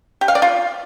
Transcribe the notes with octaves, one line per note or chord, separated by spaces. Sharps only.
G4
F5
D5
F4